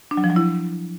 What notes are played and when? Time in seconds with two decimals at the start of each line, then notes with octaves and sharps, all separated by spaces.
0.11 D4
0.17 F#3
0.24 F3
0.30 F#3
0.36 E4